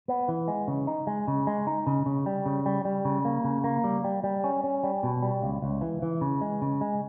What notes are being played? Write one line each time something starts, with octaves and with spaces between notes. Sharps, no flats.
B3
E3
G#3
C#3
D#4
G#3
C#3
G#3
D#4
C#3
C#3
G3
C#3
G3
G3
C#3
A#3
C#3
A#3
G3
G3
G3
C#4
C#4
G3
B2
G3
C#2
C#2
E3
E3
C#3
G#3
C#3
G#3